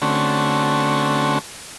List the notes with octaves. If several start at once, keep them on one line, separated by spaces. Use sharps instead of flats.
D3 A3 C4 C#4 F#4